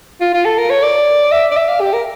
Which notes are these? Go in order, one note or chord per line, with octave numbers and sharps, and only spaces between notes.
F4
F4
A4
A#4
C#5
D5
E5
D5
E5
F5
G4
A#4